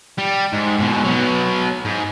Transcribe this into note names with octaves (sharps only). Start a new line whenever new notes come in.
G3
G#2
G#2 B2
B2 F#3
G#2